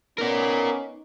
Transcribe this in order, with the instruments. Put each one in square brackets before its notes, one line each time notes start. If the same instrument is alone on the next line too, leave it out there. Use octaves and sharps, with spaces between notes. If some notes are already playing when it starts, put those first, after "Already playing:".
[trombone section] B3 C#4 [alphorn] D#4 [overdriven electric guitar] A#4 D5